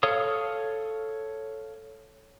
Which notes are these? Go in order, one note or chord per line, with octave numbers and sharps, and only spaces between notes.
A4 C#5 F5 D#6